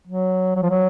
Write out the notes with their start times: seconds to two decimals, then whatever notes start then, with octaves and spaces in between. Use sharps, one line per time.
0.07 F#3
0.56 F#3
0.62 F3
0.70 F#3